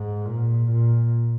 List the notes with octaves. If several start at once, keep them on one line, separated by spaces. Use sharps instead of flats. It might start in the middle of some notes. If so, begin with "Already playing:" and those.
Already playing: G#2
A#2
A#2